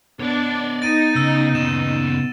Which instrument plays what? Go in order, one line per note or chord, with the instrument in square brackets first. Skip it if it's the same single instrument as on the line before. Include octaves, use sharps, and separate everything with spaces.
[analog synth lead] B3 [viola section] D4 [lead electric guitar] C#5 D5
[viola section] D#4 [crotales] A6 D7 D#7
[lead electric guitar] C#3 [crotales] E6
[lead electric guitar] A#2 C#3 [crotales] E7